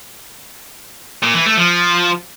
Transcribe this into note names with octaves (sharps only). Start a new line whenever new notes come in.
A#2
E3
A3
F3